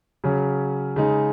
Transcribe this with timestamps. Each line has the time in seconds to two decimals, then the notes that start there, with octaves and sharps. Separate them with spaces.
0.24 C#3 F#3 C#4
0.96 C#3 G#3 D#4